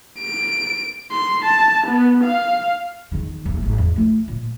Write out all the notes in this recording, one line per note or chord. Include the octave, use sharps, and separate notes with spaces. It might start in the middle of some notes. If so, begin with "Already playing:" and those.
D7
C6
A5
B3
F5
E2 D#3
D#1 F2
G#1
E2
A3 F4
A#2